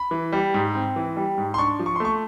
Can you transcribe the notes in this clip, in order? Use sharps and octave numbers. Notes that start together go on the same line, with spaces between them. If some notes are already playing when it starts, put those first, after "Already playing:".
Already playing: B5
E3
G3
G#2
C4
E3
G3
G#2
C6
D4 C#6
F3
C#6
C6
A3 C#6